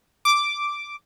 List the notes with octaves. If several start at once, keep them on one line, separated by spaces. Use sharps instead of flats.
D6